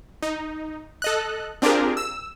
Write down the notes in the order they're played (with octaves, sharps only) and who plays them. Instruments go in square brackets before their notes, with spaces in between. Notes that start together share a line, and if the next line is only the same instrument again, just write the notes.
[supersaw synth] D#4
A4 D#5 F#6
C4 D4 F4 G4 G#4 A#4
E6